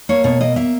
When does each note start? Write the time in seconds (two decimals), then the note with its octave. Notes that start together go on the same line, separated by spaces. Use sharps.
0.09 A#3 C#5
0.24 B2 C#5
0.41 A#3 D#5
0.56 A#3 E5